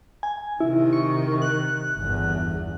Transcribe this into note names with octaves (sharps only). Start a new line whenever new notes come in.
G#5
C3 D#3 E4
C#6
F#6
G1 E2